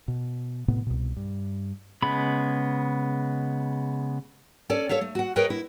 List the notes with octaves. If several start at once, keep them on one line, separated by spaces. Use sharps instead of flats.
B2
A2 C3 B3
C2 B2
G2
C#3 G#3 B3 B5
C#4 A4 D5 G#5
A4 C#5 E5 F5
A3
F#4 F#5
G#4 A#4 B4 C#5 D#5 G5
E4